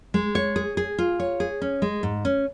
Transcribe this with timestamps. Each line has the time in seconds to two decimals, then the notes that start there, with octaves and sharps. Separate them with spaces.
0.14 G#3
0.35 C#5
0.56 G#4
0.77 G#4
0.98 F4
1.20 C#5
1.40 G#4
1.62 C#4
1.82 G#3
2.03 G#2
2.25 C#4